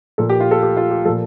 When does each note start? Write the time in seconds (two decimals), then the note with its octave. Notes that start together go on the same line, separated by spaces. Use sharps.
0.18 A#2 F3 A4
0.29 G4
0.40 F4
0.51 A4
0.63 G4
0.77 F4
0.91 G4
1.05 F3 A4
1.09 A#2